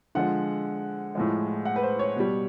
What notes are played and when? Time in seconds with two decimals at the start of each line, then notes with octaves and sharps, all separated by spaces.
0.15 D3 F3 G#3 F#5
1.15 A2 F3 G#3
1.65 F#5
1.76 B4
1.83 C5
1.99 C#5
2.16 B2 G3